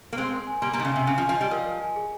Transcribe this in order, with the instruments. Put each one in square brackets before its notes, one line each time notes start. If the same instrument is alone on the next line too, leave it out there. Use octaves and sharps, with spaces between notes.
[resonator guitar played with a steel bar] A#3
[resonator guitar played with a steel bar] G#3 C4 [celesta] C6
[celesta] A#4
G#5
[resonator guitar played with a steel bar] G3 A#3 [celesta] C6
[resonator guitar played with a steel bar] G3 A#3
[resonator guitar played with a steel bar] D#3 [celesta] C6
[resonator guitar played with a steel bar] C#3
[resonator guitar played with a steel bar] C3 [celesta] G#5
[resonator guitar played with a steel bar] C#3 [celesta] G#5
[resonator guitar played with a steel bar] F3
[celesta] G#5
[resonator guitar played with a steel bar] F3
[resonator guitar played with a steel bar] G3 [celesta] D#5
[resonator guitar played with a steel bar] F3 [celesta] A#4
[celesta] A#4
G#5
G#4